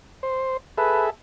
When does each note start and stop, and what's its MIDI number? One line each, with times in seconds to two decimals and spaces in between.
0.23 0.57 72
0.78 1.10 68
0.78 1.10 69
0.78 1.05 71
0.78 1.10 76